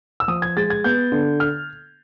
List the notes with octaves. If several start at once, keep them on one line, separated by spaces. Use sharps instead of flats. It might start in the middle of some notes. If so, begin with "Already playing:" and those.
E6
F3 D#6
G#6
G#3 A6
G#6
B3 G6
D3
F6